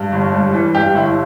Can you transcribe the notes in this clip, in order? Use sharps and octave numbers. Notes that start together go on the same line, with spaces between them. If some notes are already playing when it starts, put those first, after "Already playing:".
Already playing: G2
G1
G3
E3
G2 G4
G1 E4